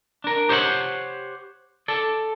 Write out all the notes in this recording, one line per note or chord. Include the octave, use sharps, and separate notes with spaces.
D4 A#4
G4 C5 C#5 E5 F#5
A4 D5